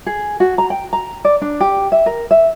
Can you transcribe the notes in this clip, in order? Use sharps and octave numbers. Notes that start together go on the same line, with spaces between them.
G#4
F#4
A#5
G5
A#5
D5
D4
G4
E5
A#4
E5